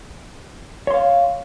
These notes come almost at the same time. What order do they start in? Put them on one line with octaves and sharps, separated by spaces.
C#5 C6 F5